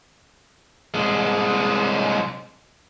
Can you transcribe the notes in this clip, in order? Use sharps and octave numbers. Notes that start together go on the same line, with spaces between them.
C2 G#3